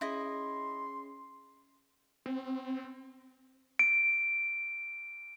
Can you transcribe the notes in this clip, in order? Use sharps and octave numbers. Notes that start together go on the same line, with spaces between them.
C#4 E4 G#4 D#5 C6 D#6
C4
D7